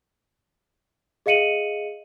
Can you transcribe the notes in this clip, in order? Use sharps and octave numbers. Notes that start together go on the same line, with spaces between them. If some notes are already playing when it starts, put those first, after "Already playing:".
G#4 D#5 F5 C#7 D#7 F#7